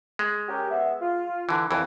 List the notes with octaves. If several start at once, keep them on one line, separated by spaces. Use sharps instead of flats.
G#3
C#4 G4 A#4
B3 E5
F4
D3 E3
C2 F2 E3